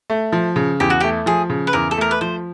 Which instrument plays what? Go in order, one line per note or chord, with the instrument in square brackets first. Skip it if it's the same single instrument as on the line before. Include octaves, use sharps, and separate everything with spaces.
[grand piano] A3
F3
C#3
[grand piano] E2 [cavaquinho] G4
[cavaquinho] F#4
G4
[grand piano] A3
[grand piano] F3 [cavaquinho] G#4
[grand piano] C#3
[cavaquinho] B4
[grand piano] E2 [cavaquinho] A#4
[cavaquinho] A4
[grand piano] A3 [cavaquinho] A#4
[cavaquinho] B4
[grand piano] F3 [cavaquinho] C5